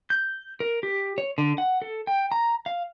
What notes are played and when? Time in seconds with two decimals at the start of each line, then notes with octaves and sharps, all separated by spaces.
0.10 G6
0.60 A#4
0.83 G4
1.18 C#5
1.38 D3
1.58 F#5
1.82 A4
2.07 G5
2.32 A#5
2.66 F5